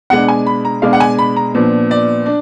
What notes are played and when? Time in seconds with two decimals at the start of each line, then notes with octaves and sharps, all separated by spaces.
0.10 B2 G#3 D4 F#5
0.28 G#5
0.46 B5
0.65 A#5
0.82 B2 G#3 D4 F5
0.93 F#5
1.00 G#5
1.19 B5
1.36 A#5
1.54 A#2 F3 B3 D4
1.91 D5
2.26 D4